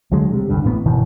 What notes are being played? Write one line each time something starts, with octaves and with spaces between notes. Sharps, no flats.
C2 D3 F#3 G#3
C3 G3
F#1 C#2 G2 D3
A1 A2 C#3 B3
G1 B2 D#3 E3